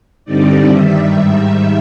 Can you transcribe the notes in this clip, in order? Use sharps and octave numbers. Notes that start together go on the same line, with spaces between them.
G2 D3 G3 C4 D#4 D5
G2 D#3 G3 E5
G#2 D#3 G3